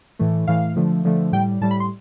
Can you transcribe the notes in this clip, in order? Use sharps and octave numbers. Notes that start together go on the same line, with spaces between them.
A2 E3 A3
A2 E3 A3 F5
D3 F3 A3
D3 F3 A3
A2 G3 G5
A2 G3 A5
B5
C6